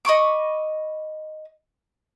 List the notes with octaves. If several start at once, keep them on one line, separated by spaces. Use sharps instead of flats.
D#5 B5 C#6 D6